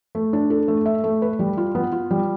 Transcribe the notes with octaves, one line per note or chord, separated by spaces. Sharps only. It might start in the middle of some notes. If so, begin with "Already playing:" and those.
A3
D4
A4
A3
E5
A3
B4
G3
F4
B3
F4
G3